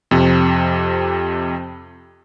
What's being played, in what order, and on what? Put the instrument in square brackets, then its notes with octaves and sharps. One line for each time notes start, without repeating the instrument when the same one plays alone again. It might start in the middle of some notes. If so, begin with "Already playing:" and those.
[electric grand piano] F2 C3